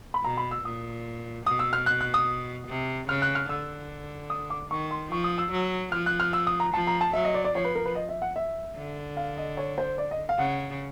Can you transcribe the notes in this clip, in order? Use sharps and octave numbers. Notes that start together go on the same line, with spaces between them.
B5
B2 A#5
B5
E6
A#2 D#6
B2 D#6
E6
F6
F#6
F#6
D#6
C3
C#3 F6
F#6
F6
D3 E6
D#6
D6
D#3 C#6
C6
F3 C#6
D#6
E6
F#3
F3 F6
F#6
F6
E6
D#6
A#5
F3 A5
A#5
A5
F#3 E5
D#5
D5
D5
F3 C#5
B4
A#4
B4
D#5
E5
F#5
E5
D3
F5
D#5
C#5
C5
D5
D#5
F5
C#3 F#5